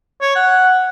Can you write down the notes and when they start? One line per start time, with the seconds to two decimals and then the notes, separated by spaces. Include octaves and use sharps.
0.21 C#5
0.36 F#5